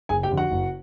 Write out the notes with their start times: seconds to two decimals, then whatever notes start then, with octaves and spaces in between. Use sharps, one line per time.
0.09 F#1 G#4 G#5
0.23 G4 G5
0.31 F2 D3
0.37 F#4 F#5
0.51 F#1